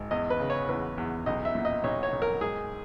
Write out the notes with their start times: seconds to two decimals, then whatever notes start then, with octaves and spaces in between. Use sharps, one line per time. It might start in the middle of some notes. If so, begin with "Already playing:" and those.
Already playing: G#1
0.11 E2 D#5
0.30 B4
0.40 C#3
0.50 C#5
0.68 E2 B4
0.98 E2
1.26 B1 D#5
1.45 E5
1.55 A#2
1.65 D#5
1.84 B1 C#5
2.03 C#5
2.13 B1
2.22 A#4
2.41 G#1 G#4